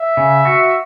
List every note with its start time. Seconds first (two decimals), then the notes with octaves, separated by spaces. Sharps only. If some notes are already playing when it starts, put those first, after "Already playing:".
Already playing: E5
0.17 C#3
0.45 F#4